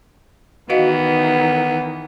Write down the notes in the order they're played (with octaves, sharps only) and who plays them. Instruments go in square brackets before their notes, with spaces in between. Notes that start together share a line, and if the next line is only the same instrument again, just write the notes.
[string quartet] D#3 E3 [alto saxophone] B3 [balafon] F#4 D#5 F5